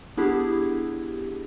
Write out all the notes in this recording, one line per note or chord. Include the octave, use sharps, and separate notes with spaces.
B3 D4 E4 G4 G#4